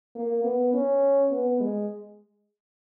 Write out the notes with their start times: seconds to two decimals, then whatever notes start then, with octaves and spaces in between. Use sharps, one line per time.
0.15 A#3
0.44 B3
0.74 C#4
1.31 B3
1.60 G#3